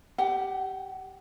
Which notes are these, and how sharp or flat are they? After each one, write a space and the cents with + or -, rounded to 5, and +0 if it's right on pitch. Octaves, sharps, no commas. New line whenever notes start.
G4 +0 F#5 +25